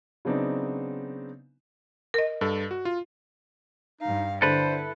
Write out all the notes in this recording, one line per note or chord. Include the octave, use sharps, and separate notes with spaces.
C#3 F#3 B3 C4 D4 D#4
A#4 D#5
G2 A4
F#4
F4
G2 D#4 F5
D3 E4 A4 B4 C5